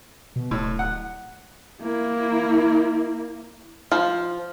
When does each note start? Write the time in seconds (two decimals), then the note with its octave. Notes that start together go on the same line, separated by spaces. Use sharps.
0.36 B2
0.51 D1 A2
0.79 F#5
1.82 A#3 E4
3.92 F3